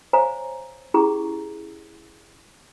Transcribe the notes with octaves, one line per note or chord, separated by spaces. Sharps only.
C5 C#5 F5 G#5 A#5
C#4 E4 G4 G#4 A#5 C#6